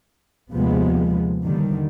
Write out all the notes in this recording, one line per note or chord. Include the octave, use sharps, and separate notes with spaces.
D#2 C3 F3 G#3 B3
D#2 D3 D#3 G3